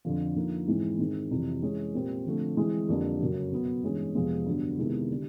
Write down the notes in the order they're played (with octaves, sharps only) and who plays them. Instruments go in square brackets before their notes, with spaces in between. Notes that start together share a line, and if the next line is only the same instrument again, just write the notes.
[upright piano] F2 D3 F3
D3 F3 A#3 D#4
G#2 E3 G#3 C4 E4
G#2 D#3 G#3 C4
F2 C3 E3 G3
E3 G#3 C#4
A#2 G3 C4
D3 F3 A3 C4
E3 G#3 C4 E4
F2 D3 G3 A#3 D4
F#2 C#3 F#3
B2 F#3 B3
G2 E3 G#3 C#4
F2 C3 F3 G#3 B3
G2 D3 F#3 B3
C3 D#3 G#3 B3 E4
D3 G3